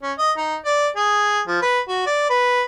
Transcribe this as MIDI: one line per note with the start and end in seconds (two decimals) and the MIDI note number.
0.03 0.13 61
0.18 0.31 75
0.37 0.56 63
0.65 0.88 74
0.96 1.41 68
1.48 1.59 53
1.62 1.80 71
1.88 2.03 66
2.06 2.29 74
2.30 2.63 71